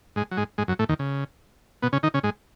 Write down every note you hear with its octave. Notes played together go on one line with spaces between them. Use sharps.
G#2 G#3
F#3
G#2 G#3
G#2 G#3
F#2 F#3
A2 A3
D#2 D#3
C#3
B2 B3
C#3 C#4
D#3 D#4
C#3 C#4
G#2 G#3